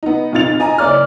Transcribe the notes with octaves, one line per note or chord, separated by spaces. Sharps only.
B3 D#4
B1 F2 D#4 F4 A6 F7
D#5 G#5 A#5
F#1 C#5 D5 F6